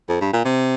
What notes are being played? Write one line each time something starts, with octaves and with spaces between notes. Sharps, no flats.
F2
G2
A#2
C3